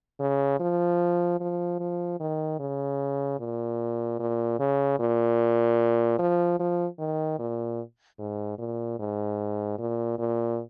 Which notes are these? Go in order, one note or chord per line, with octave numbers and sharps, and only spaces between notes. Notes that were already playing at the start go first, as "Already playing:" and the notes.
C#3
F3
F3
F3
D#3
C#3
A#2
A#2
C#3
A#2
F3
F3
D#3
A#2
G#2
A#2
G#2
A#2
A#2